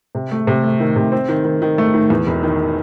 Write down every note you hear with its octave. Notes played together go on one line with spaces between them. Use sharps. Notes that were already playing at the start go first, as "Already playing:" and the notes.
C3
A3
C3
A3
D#3
C3
C4
D#3
D#3
D#3
A3
D#3
E2
E1
D#3